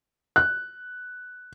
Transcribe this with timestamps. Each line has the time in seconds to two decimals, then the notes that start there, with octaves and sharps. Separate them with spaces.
0.36 F#6